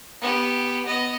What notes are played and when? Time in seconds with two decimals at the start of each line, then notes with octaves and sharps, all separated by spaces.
0.22 B3 G4
0.85 B3 D#5